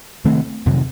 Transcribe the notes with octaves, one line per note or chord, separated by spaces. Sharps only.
C3 D#3 A3 C4
F2 C3 D#3 F#3